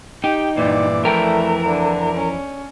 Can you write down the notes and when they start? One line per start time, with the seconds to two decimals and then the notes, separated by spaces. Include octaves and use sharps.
0.24 D#4 G4 G5
0.57 G2 A#2 E3 D5
1.05 F2 A3 E4 A#4 G5
1.66 D3
2.16 C#4